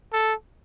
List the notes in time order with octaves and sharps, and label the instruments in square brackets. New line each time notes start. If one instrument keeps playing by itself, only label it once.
[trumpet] A4